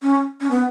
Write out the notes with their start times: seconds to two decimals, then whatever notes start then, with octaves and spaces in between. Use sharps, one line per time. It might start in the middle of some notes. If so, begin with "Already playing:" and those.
0.02 C#4
0.41 C#4
0.51 B3